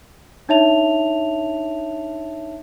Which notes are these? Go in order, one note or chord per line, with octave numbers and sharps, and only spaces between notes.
D4 D#4 C#5 E5 A5 F7